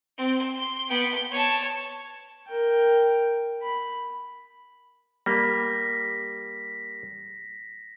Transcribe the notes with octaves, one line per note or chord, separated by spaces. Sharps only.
C4
C6
B3 G5
C#5 A5
A#4 G5
B5
G3 A#3 A#6 B6